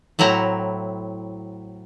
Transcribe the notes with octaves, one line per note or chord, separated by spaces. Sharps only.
A2 F#3 C4 E4 A#5